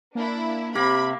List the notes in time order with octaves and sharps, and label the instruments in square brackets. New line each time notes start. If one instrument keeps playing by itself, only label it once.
[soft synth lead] A#3 [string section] D4 E4
[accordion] C3 [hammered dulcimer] A#3 [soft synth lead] G4 [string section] B5